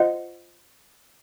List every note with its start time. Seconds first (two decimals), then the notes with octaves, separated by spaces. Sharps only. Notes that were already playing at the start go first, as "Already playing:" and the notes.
Already playing: F4 C5 D#5 F#5